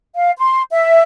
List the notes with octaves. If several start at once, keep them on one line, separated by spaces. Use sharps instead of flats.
F5
C6
E5